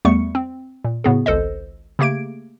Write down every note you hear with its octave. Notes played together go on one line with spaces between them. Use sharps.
E2 G3 A3 B3 C#6 C#7
C4
A#2
A2 C#3 B3 F#4 G#4
G#1 C#2 A4 C5 D#5
C#3 A3 A#3 G4 G#6 D7